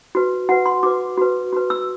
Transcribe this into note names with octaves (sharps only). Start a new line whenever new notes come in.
F#4 B4
F#4 B4 F#5
C6
F#4 B4 D6
F#4 B4
F#4 B4
E6